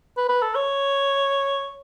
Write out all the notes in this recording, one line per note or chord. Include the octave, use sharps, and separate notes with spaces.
B4
B4
A4
C#5